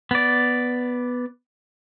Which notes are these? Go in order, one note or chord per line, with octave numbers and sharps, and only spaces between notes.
B3 D5